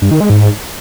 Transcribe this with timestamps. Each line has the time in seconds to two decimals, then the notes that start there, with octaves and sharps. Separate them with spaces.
0.02 G2
0.11 D#3
0.20 G#3
0.30 G#2